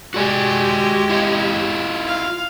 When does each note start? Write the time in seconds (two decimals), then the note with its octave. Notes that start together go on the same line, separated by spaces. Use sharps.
0.14 G#3 F#4 G4 D5 G#5
1.09 E4 F4 D#5
2.07 F5